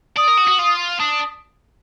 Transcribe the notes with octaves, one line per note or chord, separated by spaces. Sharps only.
D5 D#6
A#4
F#4
F#4
F4
D4 D#6